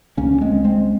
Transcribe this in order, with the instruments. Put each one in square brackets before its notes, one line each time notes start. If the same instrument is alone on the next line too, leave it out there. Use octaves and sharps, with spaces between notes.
[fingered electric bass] C#2 C#3 A#3 C#4
G#3 C4
G#3 C4